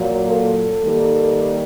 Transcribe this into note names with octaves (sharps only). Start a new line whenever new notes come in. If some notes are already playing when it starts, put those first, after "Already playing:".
Already playing: A#2 F#3 A#3
A4
D#3 G3 A#3